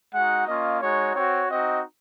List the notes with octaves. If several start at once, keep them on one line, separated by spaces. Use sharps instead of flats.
G#3 D#4 F#4 F#5
A#3 C#4 F4 D#5
G#3 D#4 F#4 C#5
C4 F#4 C#5
C4 D#4 F#4 D#5